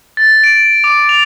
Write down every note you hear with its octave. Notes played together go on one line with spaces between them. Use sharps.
A6
D7
D6
F7